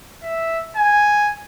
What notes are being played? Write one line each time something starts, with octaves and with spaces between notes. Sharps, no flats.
E5
G#5